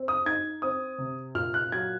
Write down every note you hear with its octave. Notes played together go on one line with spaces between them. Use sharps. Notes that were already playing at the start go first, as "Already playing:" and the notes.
Already playing: C4
D#6
D#4 G#6
C4 D#6
C3
A#2 F6
F#6
F#3 G#6